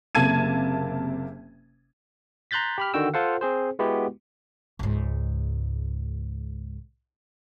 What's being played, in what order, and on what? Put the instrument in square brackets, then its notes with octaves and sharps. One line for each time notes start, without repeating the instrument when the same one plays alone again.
[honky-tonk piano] F#1 C3 A#3 A5 G#6 D#7
[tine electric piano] A#5 C6 F#6 G6 A6 B6
G4 B5 F6
D3 D#3 F#4 G5 E6
F4 A4 C5 F5 F#5
C4 G#4 C5
G#3 B3 E4 F#4 G4
[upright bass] C#2 G#2